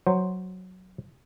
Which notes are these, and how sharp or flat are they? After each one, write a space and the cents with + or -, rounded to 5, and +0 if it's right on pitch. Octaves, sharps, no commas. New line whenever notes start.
F#3 +0 C5 +0